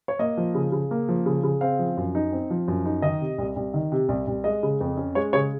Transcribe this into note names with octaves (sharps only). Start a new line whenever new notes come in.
C#5
A#3 D#5
F3
C#3
C#3
A#3
F3
C#3
C#3
C4 F5
F3
F#2
D#4
C4
F3
F#2
D#4
D#3 D#5
C3
C2
C2
D#3
C3
C2
C2
G#3 D#5
C#3
F2
C#4
G#3 C#5
C#3 C#5